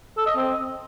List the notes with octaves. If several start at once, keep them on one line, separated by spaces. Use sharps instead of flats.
A4
D#5
C4